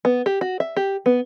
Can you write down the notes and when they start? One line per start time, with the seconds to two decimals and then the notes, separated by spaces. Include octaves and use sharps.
0.05 B3
0.26 G4
0.41 F#4
0.60 E5
0.77 G4
1.06 B3